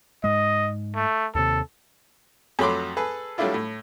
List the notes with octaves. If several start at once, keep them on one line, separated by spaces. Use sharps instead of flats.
G#2 G#3 D#5
A3
D#2 C3 A4
F2 F#3 A3 B5 C6 D6
G#4 A4 B4
F#3 G3 A3 D4 E4 F4
A2